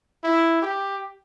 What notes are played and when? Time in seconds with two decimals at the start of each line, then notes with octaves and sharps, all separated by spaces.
0.23 E4
0.62 G4